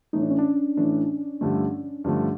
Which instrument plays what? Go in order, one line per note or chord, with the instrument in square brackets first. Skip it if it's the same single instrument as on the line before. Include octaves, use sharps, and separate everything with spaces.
[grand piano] A2 E3 A3 [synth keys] D#4
[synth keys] D4
C#4
D4
[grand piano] A2 E3 A3 [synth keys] D4
[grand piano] G2 D3 F3 A3
G2 D3 F3 A3